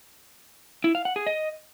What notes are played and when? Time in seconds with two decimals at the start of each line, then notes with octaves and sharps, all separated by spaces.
0.84 E4
0.95 F5
1.05 F#5
1.16 G#4
1.27 D#5